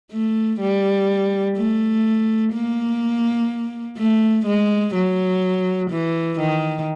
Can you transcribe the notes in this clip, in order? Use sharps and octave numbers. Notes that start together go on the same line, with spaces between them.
A3
G3
A3
A#3
A3
G#3
F#3
E3
D#3